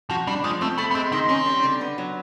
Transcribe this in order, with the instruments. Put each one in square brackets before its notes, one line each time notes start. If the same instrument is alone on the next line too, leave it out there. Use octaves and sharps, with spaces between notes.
[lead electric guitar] F3 [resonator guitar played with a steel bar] F#4
[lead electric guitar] G3 [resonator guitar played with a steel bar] D4
[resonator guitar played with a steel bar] F3 [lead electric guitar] G#3
[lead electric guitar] A3 [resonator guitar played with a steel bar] C4
[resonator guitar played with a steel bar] A3 [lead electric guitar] B3
[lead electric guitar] B3
[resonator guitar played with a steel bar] G#3 [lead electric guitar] C4
[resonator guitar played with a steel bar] D#3 [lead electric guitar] C4
[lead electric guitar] C4 [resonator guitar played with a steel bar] C#4
[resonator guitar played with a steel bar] G3
D3
B3
F#3